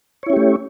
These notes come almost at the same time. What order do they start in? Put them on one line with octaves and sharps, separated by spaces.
C#5 E4 C#4 G4 A3